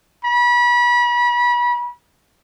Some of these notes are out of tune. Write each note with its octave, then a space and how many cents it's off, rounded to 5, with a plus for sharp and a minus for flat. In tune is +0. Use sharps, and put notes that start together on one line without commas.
B5 -35